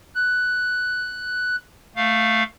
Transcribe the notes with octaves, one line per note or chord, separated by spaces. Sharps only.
F#6
A3 F5